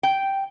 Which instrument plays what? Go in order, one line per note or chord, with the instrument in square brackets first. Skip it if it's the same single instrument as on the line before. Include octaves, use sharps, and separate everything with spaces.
[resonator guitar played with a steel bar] G5